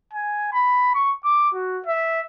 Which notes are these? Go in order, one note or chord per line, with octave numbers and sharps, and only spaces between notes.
G#5
B5
C#6
D6
F#4
E5